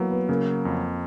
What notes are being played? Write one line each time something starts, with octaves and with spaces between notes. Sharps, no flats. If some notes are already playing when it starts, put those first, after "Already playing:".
Already playing: E3 F#3 A#3 B3
B3
C#3 A#3
F2